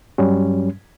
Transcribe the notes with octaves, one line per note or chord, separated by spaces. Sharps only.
G2 F#3 G3 C#4